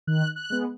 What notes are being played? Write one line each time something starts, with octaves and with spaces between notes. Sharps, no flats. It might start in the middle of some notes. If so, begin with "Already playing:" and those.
D#3 F#6
F#6
G#3 B3